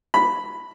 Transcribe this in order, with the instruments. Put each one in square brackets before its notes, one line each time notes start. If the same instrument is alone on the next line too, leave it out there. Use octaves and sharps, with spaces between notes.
[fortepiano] B5